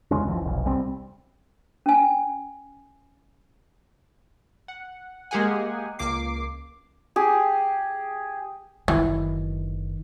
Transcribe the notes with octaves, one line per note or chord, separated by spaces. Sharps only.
E2 C#3 G#3 C#4
F#1 C#2 E3 F3
F1 B1
C2 G3 C4
C#4 G#5
F#5
G#3 A#3 G4 G#4 F#5 G#5
C#2 A#3 D6 C7
G4 G#4
F#1 D#3 E3